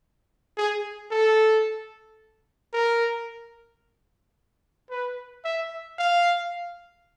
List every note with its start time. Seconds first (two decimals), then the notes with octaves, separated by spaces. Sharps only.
0.57 G#4
1.11 A4
2.73 A#4
4.90 B4
5.45 E5
5.99 F5